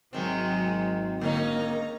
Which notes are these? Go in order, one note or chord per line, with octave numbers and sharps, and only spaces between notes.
G#1 C3 D#3 F#3 G#3 C4
D3 A#3 C#4 D#4 A#5